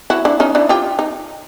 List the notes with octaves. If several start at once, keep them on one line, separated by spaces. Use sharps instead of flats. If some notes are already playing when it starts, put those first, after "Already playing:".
E4 F#4
D4 E4
C#4 D#4
D4 E4
F4 G4
D#4